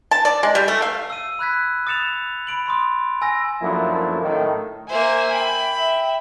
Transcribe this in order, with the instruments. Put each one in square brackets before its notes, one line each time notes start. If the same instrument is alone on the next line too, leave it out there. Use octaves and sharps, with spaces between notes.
[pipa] A5
D5
G#3
G3
A3
F5
[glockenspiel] E6 D#7
B5 F#6 G#6 B6
D#6 A6 C#7 E7 F7
B5 D7 F#7
B5 C6 D#6
G#5 E6 A#6
[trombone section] F#2 F3 A3 A#3 D4 E4
A2 D#3
[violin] A#3 C5 [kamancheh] E5 G#5
[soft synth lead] G5 [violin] B5
[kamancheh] E5